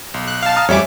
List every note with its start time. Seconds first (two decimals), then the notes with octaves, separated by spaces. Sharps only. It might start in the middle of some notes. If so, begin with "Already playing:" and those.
0.14 B1
0.28 F#6
0.42 F5 A5
0.56 A#5 D#6 F6
0.69 F2 G3 C#5 E5 G#5 D6